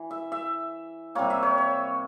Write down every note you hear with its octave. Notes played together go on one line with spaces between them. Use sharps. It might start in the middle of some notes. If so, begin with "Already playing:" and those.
Already playing: E3
E5
E5
C3 G3 A#3 C#5
E5
C#5
C#5